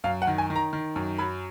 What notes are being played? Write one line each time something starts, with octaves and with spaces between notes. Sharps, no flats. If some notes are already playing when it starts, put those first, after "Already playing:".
F#2 F5
F#5
D#3
G#5
D#3
A#5
D#3
F#2
F#3 B5